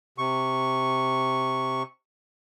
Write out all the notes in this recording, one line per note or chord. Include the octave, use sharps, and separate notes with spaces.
C3 C#6